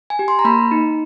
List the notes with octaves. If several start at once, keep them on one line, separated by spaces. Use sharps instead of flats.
G#5
G4
C6
A#5
A#3 B5
D#4